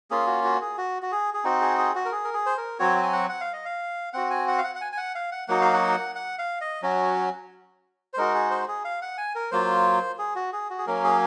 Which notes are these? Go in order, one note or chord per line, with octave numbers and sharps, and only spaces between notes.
A#3 C#4 F4 G#4
F#4
F#4
G#4
F#4
F#4
G#4
G#4
C4 D#4 F#4
G#4
G#4
F#4
A#4
G#4
A#4
G#4
C5
A#4
F#3 C4 F#4 C#5
G#5
F#5
F#5
F5
D#5
F5
C4 F#4 F#5
G#5
F#5
F5
F#5
F#5
G#5
G#5
F#5
F5
F#5
F#3 A#3 D#4 F#4 F#5
F5
F#5
F#5
F5
D#5
F#3 C#4 F#4
C5
G#3 D#4 F#4 A#4
G#4
C5
G#4
F5
F#5
G#5
A#4
F#3 A#3 F4 C5
G#4
F#4
G#4
F#4
G#4
F#3 A#3 C#4 A#4
G#4